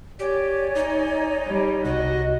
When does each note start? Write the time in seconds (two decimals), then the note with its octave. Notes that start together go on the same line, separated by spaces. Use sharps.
0.19 G4 C#5 D5 G#5
0.75 D#4
1.47 G3
1.85 C2 F#4 D#5